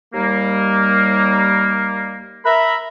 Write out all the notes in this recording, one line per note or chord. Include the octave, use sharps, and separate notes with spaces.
D#2 G3 A#3
A#4 E5 A#5 B5